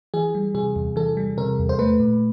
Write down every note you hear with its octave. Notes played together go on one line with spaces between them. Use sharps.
E3 G#4
G3
C3 G#4
E2
E3 A4
G3
C3 A#4
E2
C5
A3 B4
A#2